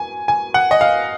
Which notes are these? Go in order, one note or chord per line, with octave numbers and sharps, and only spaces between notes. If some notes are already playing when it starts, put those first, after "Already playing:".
Already playing: G#5
G#5
F#5
D#5
F5